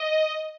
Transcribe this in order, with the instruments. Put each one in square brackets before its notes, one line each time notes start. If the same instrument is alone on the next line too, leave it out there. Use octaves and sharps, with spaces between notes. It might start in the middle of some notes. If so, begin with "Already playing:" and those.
Already playing: [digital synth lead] D#5